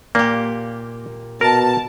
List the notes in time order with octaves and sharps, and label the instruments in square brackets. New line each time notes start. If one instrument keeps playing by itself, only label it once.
[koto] A#2 G4 [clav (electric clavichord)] A#3
[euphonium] B2 [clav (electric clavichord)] A#4 [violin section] A5